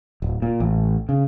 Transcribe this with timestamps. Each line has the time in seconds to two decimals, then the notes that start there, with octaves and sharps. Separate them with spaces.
0.22 D1
0.42 A#2
0.60 A1
1.09 C#3